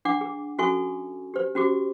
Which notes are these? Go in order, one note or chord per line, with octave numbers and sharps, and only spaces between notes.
D4 F#5 D6
G#4
C#4 F#4 A4 E5 G#5 C#6
G4 C5
C#4 F#4 G4 D6